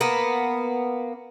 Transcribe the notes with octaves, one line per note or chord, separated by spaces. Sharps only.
A#3 B3